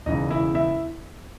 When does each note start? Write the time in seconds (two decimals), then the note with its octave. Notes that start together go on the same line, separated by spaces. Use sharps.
0.06 E1 E2 C#3 D#4 D#5
0.30 E4 E5
0.55 E4 E5